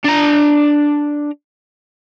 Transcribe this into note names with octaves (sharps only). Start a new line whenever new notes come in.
D4 A#5